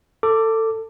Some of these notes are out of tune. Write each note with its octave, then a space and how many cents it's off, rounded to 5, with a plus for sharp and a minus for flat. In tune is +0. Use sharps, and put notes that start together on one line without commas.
A4 +25 D6 +0